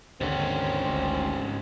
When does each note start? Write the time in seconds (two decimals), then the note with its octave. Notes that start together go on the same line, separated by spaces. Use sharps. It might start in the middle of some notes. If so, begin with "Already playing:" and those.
0.21 D#2 G#2 D3 C4 C#4
0.85 G#1 D2